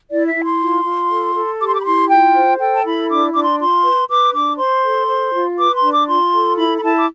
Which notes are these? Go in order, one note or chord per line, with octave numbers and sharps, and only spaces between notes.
E4 D5
E5
E4
C6
F4
F4
A4
A4
G4 D6
C6
D6
B5
E4 C6
F4 G5
C5
A4 G5
A5
E4 B5
D4 D6
D4 D6
C6
F4 C6
B4
B4 D6
D4 D6
C5 C6
A4
C5
F4
B4 D6
C6
D4
D6
F4 C6
A4
E4 B5
B5
E4 A5
D6